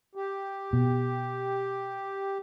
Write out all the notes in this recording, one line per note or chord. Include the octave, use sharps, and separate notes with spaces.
G4
B2